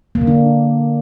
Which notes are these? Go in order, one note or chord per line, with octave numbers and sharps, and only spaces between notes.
A#3
D3
D4